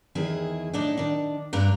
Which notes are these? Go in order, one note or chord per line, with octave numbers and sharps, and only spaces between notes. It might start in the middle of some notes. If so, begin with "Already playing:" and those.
E2 D#3 E4 G#4
A2 D4 D#4
D#3 D4
G2 G3 D4 D5 A#5